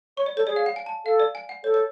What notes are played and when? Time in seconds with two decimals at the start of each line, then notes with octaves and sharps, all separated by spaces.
0.17 C#5 C#6
0.26 D5
0.37 A4 C#5
0.47 G#4 D5
0.56 F5
0.66 F#5
0.76 G#5
0.86 A5
1.05 A4 F5
1.20 D5
1.35 G#5
1.49 F#5
1.64 A4 C#5
1.74 C#5